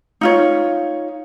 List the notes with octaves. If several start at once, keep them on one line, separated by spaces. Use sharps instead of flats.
D#4 F4 C#5